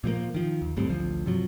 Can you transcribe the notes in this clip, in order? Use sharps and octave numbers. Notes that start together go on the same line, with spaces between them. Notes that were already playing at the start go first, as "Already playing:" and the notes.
A#2 F3 G3 A#3
D#3 F3
D#2
G1 A2 G3 C4
A1 D2 F3
G2 C3 F3 F#3